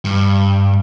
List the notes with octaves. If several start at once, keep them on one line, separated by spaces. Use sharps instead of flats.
G2